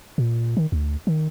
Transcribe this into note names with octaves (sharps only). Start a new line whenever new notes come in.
A#2
D#3
D2
D#3